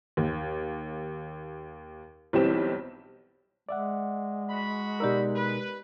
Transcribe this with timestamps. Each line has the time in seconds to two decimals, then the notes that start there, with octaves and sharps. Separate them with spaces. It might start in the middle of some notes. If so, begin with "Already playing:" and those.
0.17 D#2
2.33 B1 E3 G3 C4 G4 E7
3.69 G#3 D5 E5 F#5
4.50 F#4 B5
5.00 B2 D#4 G4 A#4 D5 E6
5.36 B4